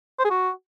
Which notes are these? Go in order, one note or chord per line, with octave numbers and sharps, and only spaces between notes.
C5
G#4
F#4